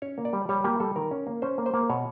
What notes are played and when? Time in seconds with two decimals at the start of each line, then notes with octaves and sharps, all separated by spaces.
0.02 C#4 C#5
0.18 A#3
0.25 D5
0.33 G3
0.49 G3 C#5
0.64 A#3 G4
0.80 G3 A4
0.96 D#3 A#4
1.11 C#4
1.27 A#3
1.42 C#4 C5
1.58 A#3
1.66 C5
1.74 A#3
1.90 B2 C#5